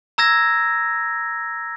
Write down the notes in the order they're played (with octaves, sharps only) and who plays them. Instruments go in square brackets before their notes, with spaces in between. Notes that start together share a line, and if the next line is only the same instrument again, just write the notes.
[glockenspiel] A#5 E6 G#6 A#6